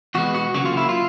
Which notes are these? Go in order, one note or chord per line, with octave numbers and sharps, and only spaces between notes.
E2 B2 G#3 B3 F#4
F#4
C#3 F#3 A#3 F#4
F4
E4
F4